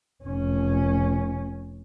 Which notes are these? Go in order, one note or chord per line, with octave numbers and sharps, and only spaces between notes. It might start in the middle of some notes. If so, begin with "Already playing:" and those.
F1 C#4